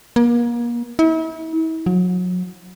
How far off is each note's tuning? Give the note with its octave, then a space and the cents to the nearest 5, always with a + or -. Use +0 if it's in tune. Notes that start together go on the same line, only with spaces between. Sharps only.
A#3 +35
E4 -40
F#3 -35